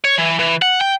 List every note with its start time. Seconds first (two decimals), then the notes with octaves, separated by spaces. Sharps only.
0.05 C#5
0.18 E3
0.39 E3
0.62 F#5
0.81 G5